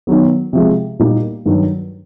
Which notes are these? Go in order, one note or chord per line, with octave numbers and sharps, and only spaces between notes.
D#3 F#3 B3
C3 F3 G#3
A#2 G3 A#3 D#4 G4
G2 D#3 F#3